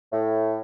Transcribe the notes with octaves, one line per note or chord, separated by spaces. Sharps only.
A2